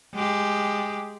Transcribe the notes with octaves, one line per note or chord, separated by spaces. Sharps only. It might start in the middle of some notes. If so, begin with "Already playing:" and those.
G#3 G4